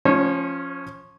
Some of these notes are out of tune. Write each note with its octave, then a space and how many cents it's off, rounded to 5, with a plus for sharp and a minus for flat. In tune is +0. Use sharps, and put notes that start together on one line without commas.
F3 +5 C#4 -5 C#5 -40